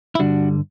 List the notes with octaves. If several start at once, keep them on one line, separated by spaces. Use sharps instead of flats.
E4
G2 D3 G3 D4 F#4